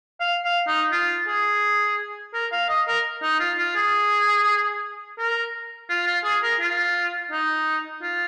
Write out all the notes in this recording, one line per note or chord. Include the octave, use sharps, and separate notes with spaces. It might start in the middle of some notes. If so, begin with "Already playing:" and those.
F5
F5
D#4
F4
G#4
A#4
F5
D#5
A#4
D#4
F4
F4
G#4
A#4
F4
F4
G#4
A#4
F4
D#4
F4